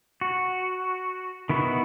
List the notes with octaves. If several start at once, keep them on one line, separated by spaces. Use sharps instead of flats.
F#4
D#3 B3 E4 F#4